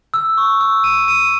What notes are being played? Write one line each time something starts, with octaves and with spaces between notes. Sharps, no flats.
E6
C#6
E6
D#7
D#7